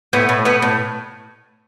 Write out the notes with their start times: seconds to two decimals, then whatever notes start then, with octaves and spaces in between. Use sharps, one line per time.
0.13 A2 B3
0.29 A2
0.45 A2 B3
0.62 A2